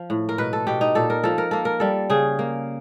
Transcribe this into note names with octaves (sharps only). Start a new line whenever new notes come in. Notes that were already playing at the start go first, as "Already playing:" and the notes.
Already playing: F3
A2
A#4
B2 B4
A4
B2 G4
D#4
A#2 A4
A#4
F3 A4
A#4
A#3 A4
A#4
G3 A4
C#3 G#4
A#3